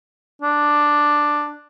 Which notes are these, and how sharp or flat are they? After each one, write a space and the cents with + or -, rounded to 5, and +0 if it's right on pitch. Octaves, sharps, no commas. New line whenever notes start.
D4 +5